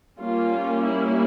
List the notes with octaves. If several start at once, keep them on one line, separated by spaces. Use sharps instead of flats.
G3 A#3 C#4 F4
E4